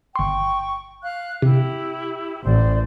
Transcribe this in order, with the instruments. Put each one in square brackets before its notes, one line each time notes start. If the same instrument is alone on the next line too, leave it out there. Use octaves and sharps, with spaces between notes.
[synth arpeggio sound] G1 C6 [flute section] G5 C#6
[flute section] F5 F#6
[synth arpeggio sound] C3 [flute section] E4 G4
[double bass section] A1 [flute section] C5 D5